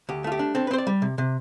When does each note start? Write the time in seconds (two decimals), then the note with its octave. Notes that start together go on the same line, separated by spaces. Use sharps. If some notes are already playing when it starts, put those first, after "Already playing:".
0.09 D2 G4
0.24 A3 F4
0.32 G4
0.39 D4
0.55 C4 A4
0.67 B4
0.71 C4 C5
0.78 D5
0.87 G3
1.02 C3
1.18 C3